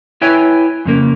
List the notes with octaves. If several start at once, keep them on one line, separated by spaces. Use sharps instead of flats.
E4 B4 C#5 E5 G5 G#5
F2 C#3 A#3